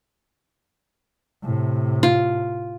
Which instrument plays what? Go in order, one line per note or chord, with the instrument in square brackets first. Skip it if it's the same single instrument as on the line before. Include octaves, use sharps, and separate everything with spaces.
[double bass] A2 C3
[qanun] F4